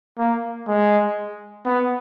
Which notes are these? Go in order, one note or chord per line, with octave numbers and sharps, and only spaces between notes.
A#3
G#3
B3